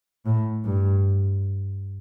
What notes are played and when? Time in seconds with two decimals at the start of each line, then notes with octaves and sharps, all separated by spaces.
0.26 A2
0.65 G2